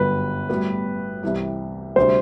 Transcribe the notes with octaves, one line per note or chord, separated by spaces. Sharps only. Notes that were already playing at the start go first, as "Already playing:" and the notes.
Already playing: G1 F#2 D3 G3 B4
A2 G3 B3 F#4
C2 C3 E3 G3
D2 C3 G3 D4 C5